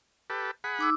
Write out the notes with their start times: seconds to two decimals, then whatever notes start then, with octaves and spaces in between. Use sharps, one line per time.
0.30 G4 A4 B4
0.64 G#4 F#5 B5
0.79 D#4 D6 E6